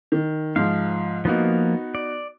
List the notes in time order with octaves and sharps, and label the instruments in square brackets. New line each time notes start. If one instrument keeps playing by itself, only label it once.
[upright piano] D#3
[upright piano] G#2 F3 [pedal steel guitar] F5
[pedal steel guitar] F3 A#3 [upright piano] B3 D#4 F#4
[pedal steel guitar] D5